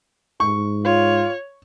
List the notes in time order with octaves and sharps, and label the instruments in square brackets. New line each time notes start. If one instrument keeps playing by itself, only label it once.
[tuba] G#2 [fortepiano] C#6
[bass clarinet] F4 [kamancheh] C#5